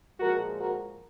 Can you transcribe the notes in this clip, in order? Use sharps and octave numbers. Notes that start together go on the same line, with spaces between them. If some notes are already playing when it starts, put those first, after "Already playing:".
A#2 F3 G#3 F#4 A#4
F#4 A#4